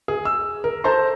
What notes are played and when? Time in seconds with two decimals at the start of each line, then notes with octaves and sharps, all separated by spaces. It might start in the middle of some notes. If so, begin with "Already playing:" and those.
0.08 G#4
0.25 E6
0.64 A#4
0.84 A4 C5 A5 A#5 C6